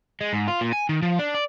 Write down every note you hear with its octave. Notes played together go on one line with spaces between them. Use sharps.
G#3
G#2
F4
A#2
G#5
D#3
F3
D4
D5